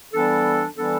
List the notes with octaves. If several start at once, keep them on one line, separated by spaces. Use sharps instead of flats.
E3 G3 B3 D4 A4
E3 G3 B3 D4 A4